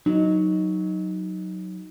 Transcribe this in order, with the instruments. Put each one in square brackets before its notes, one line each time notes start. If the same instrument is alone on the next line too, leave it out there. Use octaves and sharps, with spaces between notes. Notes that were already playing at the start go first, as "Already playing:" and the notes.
[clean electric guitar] F#3 [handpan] D#4